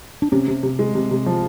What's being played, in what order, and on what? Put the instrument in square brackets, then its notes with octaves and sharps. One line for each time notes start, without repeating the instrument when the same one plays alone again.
[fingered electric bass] D4
[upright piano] C3 [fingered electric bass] C#4
[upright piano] C3
C3
G#3
C3
C3
F3